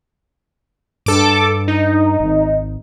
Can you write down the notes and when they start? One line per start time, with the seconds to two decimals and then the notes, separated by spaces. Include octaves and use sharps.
1.06 G2 A4 D6
1.68 D#4
2.20 G#1